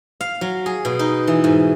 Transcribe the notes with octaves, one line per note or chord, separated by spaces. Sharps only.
F5
F#3
G#4
B2
D#4
E3
G#2